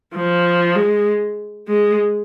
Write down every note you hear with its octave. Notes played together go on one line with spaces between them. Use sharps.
F3
G#3
G#3